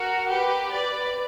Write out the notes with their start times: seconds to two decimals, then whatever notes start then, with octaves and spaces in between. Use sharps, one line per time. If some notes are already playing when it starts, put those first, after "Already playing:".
Already playing: F#4 A#4
0.31 G4 B4
0.73 B4 D5